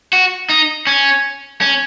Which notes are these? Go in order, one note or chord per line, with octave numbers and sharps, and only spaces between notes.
F#4
D#4
C#4
C#4